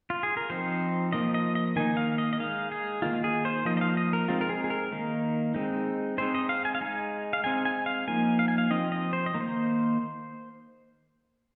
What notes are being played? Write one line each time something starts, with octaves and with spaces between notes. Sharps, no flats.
F4
G#4
A#4
F3 C4 D#4 C5
F3 A#3 D#4 D#5
D#5
D#5
D#3 A#3 D#4 G#5
F5
D#5
D#5
G#3 D#4 F5
G#4
D#3 A#3 D#4 F4
G#4
C5
F3 A#3 D#4 D#5
D#5
F5
D#5
A#4
G#3 C4 D#4 F4
A#4
G#4
G#4
A#4
D#3 A#3 D#4
G#3 C4 D#4
G#3 C4 D#4 C5
D#5
F5
G#5
F5
G#3 D#4 G#5
F5
G#3 C4 D#4 G#5
G#5
F5
F3 A#3 D#4 G#5
F5
G#5
F5
F3 C4 D#4 D#5
D#5
C5
D#5
D#3 A#3 D#4
C5